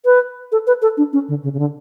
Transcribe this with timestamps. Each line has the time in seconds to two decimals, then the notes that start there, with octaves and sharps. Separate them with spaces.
0.05 B4
0.52 A4
0.67 B4
0.82 A4
0.97 D4
1.13 C#4
1.28 D3
1.43 C#3
1.54 C#3
1.59 D3